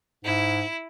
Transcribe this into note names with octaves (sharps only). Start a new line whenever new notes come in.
G#2 E4